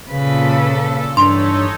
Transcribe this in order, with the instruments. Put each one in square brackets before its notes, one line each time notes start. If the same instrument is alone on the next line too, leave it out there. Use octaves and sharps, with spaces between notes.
[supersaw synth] A#2 A4 [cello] C#3 B4
[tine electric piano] G2 [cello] E3 [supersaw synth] D#4 A4 C#5 [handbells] C6